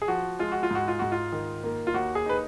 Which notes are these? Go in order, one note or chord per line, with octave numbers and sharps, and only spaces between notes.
G#4
F3 F#4
G#3 F4
F#4
F4
G#2 F#4
F4
G#2 F#4
F4
D#3
A#3
F4
D#2 F#4
G#4
D#4 B4